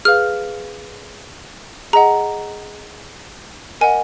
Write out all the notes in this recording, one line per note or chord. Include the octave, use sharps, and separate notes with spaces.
G#4 B4 F5 F6
G#4 D#5 F#5 A#5
A#4 D#5 F#5 G#5